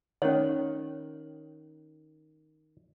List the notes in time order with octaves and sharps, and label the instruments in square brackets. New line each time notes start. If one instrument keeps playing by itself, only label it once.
[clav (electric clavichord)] D#3 [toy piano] C#4 C#5